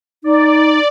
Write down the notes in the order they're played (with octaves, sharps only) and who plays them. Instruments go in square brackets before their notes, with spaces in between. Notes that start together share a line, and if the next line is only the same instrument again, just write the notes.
[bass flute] D#4 [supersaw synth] D5